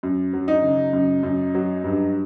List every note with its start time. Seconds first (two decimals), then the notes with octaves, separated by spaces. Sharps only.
0.03 F#2
0.33 F#3
0.48 D#4
0.62 C#3
0.93 F#2
1.23 F#2
1.55 F#3
1.84 G2